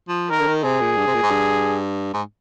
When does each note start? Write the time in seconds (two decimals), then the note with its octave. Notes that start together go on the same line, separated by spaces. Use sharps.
0.08 F3
0.30 D#3 A#4
0.39 D3
0.47 D#3
0.64 C3 G#4
0.81 A#2
0.97 G2
1.07 C3
1.14 A#2
1.23 G#2
1.30 G2
2.14 G#2